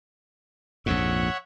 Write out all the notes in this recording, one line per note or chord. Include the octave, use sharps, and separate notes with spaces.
A#1 F2 G#2 C#5 E5 F#5